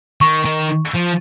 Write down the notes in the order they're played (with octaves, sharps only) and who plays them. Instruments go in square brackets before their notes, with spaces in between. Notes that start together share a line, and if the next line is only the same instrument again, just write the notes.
[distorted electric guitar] D#3 [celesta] C#6
[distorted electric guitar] D#3
F3